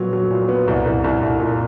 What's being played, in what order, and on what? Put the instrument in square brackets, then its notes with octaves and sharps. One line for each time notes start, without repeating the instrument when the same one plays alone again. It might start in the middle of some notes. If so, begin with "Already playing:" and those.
Already playing: [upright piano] A#2 F#3 B3
F#3
A#2
B3
C2
C2
C2
C2
A#2